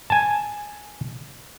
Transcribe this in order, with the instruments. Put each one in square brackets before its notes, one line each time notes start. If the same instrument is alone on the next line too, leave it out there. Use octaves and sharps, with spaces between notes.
[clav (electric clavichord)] G#5 A5